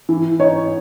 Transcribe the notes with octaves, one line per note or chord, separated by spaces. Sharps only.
E3
D#4 C#5